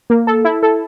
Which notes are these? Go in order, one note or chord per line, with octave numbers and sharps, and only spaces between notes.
A#3
A4
E4
A4